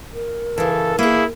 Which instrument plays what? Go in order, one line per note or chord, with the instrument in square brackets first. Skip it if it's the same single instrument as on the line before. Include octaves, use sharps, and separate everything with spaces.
[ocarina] A#4
[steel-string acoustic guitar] C#3 E3 [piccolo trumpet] A4
[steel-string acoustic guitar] A#3 G#4 [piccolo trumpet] E4